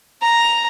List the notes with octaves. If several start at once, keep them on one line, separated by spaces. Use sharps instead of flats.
A#5